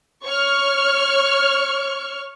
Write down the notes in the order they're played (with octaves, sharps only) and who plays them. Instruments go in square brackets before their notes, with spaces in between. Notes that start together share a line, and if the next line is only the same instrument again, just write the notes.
[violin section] C#5 C#6 F6